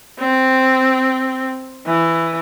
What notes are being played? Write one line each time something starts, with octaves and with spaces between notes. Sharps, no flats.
C4
E3